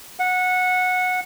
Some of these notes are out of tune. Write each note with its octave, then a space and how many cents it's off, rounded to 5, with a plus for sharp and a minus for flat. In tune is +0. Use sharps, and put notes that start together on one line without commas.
F#5 -15